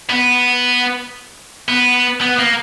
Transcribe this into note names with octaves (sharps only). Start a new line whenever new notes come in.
B3
B3
B3
A#3